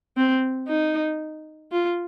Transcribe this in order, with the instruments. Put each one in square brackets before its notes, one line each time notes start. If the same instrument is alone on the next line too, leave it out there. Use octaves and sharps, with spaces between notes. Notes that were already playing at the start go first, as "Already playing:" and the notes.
[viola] C4
D#4
F4